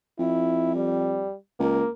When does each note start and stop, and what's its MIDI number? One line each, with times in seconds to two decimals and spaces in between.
0.19 1.25 41
0.19 0.74 64
0.75 1.33 55
1.59 1.84 37
1.59 1.89 58